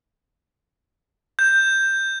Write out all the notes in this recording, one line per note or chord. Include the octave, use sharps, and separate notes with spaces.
G6